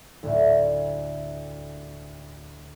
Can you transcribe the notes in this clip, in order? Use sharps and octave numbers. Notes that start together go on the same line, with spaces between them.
D2 A2